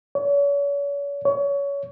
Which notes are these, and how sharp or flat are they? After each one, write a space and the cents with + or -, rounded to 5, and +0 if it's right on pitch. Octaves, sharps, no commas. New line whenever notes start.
C#5 +40
C#5 +25